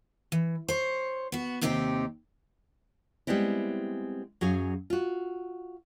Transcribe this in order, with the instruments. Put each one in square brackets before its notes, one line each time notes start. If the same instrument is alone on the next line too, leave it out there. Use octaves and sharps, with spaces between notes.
[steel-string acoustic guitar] E3
C5 C#5
B3 F#4
D#2 C3 C4 D#4 E4 G4
[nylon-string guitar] G3 G#3 B3 C4 E4
F#2 F#3 G#4 F5
F4 F#4